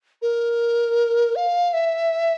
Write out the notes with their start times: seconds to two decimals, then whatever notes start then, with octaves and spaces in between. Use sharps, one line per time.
0.22 A#4
1.36 F5
1.73 E5